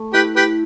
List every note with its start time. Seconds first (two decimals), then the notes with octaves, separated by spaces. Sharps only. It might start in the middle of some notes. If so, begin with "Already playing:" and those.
Already playing: A3
0.13 E4 G4 B4
0.36 G4 B4